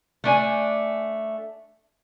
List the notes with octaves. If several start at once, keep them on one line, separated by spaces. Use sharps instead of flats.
A3 D4 G#5